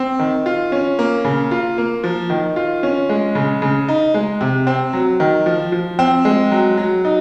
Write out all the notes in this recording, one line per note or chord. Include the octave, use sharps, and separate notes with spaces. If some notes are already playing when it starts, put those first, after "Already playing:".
Already playing: C4
D#3
F4
C#4
A#3
C#3
F4
A#3
F3
D#3
F4
C#4
G#3
C#3
C#3
D#4
G#3
C3
C4
F#3
D#3
F3
F3
C4
G#3
F#3
F#3
D#4